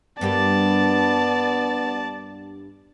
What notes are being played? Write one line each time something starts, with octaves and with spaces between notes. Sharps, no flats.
G2 A#3 B3 G4 D5 A5